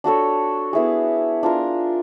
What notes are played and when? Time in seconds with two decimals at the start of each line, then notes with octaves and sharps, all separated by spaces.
0.04 D4 F#4 A4 C#5
0.73 B3 E4 G#4
1.43 D4 F4 A#4